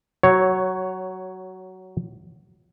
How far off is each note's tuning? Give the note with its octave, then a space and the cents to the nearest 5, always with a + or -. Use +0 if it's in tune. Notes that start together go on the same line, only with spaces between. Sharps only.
F#3 +15 C#5 +0